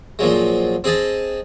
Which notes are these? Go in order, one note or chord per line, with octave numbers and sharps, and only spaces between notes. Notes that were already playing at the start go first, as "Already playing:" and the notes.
A#2 F3 F#3 G#3
C4 G#4 D#5 A5